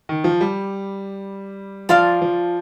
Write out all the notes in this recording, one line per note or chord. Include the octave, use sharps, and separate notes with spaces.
D#3
F3
G3
F3 D5 F5 A5 C6
F3